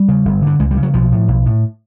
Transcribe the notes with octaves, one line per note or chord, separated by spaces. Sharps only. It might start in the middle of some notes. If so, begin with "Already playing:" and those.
Already playing: G3
C#3
G1
G2 D3
C#2 G#3
G3
C#3
F#3
B1 F3
A2
B1
A2